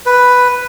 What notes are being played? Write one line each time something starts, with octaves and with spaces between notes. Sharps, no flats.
B4